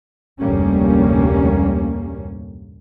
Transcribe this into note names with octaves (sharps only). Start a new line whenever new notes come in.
F1 D2 G#2 G3 A#3 C#4